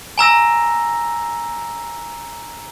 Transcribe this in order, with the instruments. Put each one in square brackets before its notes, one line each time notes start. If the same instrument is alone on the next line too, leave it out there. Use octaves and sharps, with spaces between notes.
[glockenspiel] G#5 A#5 E6 A#6